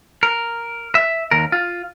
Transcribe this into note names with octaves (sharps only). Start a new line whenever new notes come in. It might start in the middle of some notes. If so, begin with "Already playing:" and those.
A#4
E5
D#2 A#4
F4